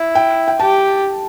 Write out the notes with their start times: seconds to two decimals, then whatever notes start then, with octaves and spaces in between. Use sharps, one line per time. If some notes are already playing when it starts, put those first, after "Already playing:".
Already playing: E4
0.15 G5
0.48 G5
0.59 G4 A5